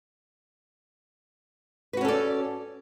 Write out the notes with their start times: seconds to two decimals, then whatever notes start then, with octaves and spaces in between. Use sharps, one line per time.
1.93 B4
1.97 F#4
2.01 C#4
2.05 A4
2.08 D5